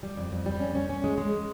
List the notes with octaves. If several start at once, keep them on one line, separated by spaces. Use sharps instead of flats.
G3
F2
F2
G3
C#4
C#4
C#4
G#3
G#3